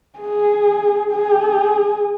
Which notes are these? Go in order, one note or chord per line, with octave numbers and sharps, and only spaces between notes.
G#4
G#4